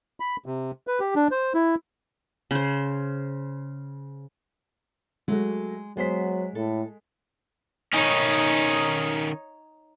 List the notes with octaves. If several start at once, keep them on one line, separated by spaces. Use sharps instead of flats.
B5
C3
B4
G4
D4
C5
E4
C#3 C5
F#3 G#3 A3 F#4
F#3 G#3 B3 C5 B6
A2 A4
D#3 C#4 D#4 C#5